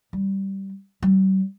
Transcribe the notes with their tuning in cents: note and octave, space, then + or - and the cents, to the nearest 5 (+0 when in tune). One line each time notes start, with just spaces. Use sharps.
G3 -10
G3 -45